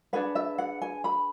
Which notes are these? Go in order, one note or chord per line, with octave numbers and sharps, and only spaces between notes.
D4 G#4 B4 F#5
E5
F#5
G#5
B5